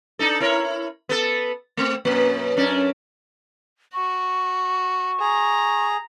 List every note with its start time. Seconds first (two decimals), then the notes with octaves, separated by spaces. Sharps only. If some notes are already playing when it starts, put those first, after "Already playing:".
0.19 D4 D#4 A4
0.40 E4 A#4 C#5
1.09 B3 A4
1.77 A3 C4
2.05 F#2 B2 A#3
2.57 F#2 C#4 D4
3.94 F#4 C#6
5.20 G#4 A#5